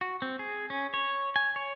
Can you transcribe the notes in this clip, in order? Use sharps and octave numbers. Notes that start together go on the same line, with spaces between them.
F#4
C4
G#4
C#4
C#5
G#5
C#5